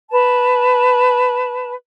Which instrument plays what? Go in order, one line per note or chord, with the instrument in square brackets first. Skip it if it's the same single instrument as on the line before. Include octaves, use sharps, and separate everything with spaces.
[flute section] B4 A5